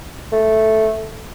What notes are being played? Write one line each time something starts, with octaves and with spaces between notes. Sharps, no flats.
A3